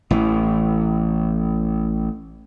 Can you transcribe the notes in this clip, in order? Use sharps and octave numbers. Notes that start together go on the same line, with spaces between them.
A1 E3